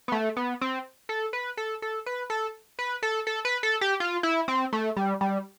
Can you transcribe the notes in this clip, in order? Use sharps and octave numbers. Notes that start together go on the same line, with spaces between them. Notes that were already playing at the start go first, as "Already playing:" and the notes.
B3
A3
B3
C4
A4
B4
A4
A4
B4
A4
B4
A4
A4
B4
A4
G4
F4
E4
C4
A3
G3
G3